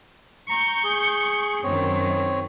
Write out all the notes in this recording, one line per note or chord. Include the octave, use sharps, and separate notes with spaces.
A#5 C#6 G6
G#4
F#2 D#3 C4 C#5